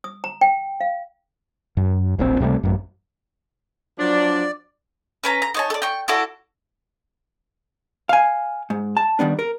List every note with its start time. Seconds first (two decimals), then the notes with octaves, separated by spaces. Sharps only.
0.04 D#6
0.24 A#5
0.41 G5
0.81 F5
1.77 F#2
2.19 D1 A#1 C4
2.40 C#2 C3 G3 A3
2.63 A1 F#2
3.99 F3 F#3 D4 D5
5.24 C#4 B4 A#5
5.42 A#5
5.54 D#4 C#5 A5
5.70 A4 D5
5.82 G5 C#6
6.08 E4 F#4 A4 D5
8.09 F5 G#5
8.70 G#2
8.97 A5
9.19 D#3 G3 B3 D4
9.39 A#4